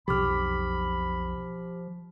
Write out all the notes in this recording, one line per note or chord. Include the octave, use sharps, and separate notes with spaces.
B1 F2 F3 G4 B5 D6 F6